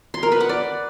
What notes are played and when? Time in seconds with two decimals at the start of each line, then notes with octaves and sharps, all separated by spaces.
0.14 C6
0.23 A#4
0.32 B4
0.40 F#5
0.49 D5